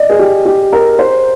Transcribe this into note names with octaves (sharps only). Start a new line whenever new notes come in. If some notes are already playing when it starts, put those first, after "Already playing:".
Already playing: D5 D#5
G#4
G4
G4
A#4
C5